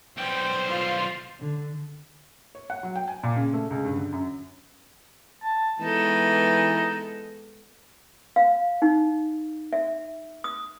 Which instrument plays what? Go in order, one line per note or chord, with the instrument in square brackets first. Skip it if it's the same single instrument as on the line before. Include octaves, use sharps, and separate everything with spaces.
[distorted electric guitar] B1 G3 [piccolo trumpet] C5 [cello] G5
[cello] F4 F5
[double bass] D3
[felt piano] C#5
F#5
F#3
G5
G#5
A#2
C#3
A3
C#2
G2
D3
F#2
[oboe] A5
[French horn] E3 [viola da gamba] G#3 B3 A4 [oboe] D#4
[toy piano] F5
D#4
E5
D#6